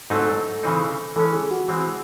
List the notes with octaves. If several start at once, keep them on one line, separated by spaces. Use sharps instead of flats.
G#2 F#3 A3 C4 D#4 A4
C#3 E3 C4 D#4
E3 G#3 C#4 A4
G#4
F#4
E3 G#3 C4 F#4